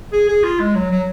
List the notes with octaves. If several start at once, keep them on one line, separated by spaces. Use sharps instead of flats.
G#4
G#4
F4
G#3
F#3
F#3